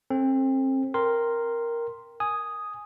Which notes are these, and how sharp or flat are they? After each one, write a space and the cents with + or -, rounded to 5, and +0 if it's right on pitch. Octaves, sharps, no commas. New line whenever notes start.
C4 +30 A4 +0
A#4 +0 G5 +0 C6 +0
G#5 +0 D#6 +0